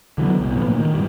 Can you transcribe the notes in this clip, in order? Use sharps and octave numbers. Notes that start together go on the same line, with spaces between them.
D3 E3 F#3 B3
C2 B2
A2 F3 B3
D2 A#2
D#3
G#2 E3 G3